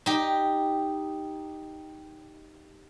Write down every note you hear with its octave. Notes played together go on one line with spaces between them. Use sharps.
D#4 G4